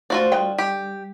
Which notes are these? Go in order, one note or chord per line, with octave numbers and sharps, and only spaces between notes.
D3 A3 F4 F#4 C5 D5
D3 G3 D#5 G5
G4